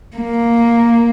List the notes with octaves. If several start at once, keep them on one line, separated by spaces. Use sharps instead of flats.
A#3